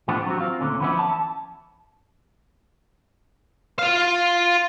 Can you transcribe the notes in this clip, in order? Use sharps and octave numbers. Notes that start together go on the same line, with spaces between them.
A2 E3 B3 C4 D4 F4
F#3 C4 F#4
C4 F4 F5
D2 A#2 D3 C#4
E3 F3 B3 C#4 E4
A5
F4 F5